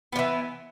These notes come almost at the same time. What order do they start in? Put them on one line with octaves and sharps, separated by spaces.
B3 F3 E3